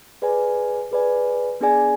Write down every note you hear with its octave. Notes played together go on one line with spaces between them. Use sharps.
G#4 B4 D5 G#5
G#4 B4 D5 G#5
B3 D4 G#4 D5 G#5